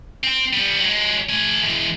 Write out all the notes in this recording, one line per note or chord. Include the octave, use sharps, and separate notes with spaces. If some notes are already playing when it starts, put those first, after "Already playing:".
C4
G3 B3
F#3 G#3
A3 G#5
E3 G#3